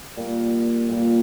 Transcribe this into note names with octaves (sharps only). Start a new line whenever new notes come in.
A#2 G3 A#3
A#2 G3 A#3